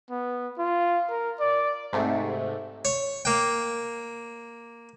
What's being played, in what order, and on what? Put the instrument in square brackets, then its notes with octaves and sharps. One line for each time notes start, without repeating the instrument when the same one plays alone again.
[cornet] B3
F4
A#4
D5
[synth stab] G#2 C3 A3
[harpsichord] C#5
A#3 G5